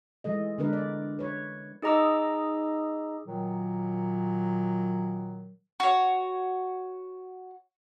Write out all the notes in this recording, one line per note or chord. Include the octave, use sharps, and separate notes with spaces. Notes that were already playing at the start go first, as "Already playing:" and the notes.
E3 G#3 A4 D#5
D3 G#3 B3 D4 A#4 B4
D5
B4 C#5
D#4 G#4 D#5 A#5 D6 E6
A#2 D#3 F#3
F#4 C#5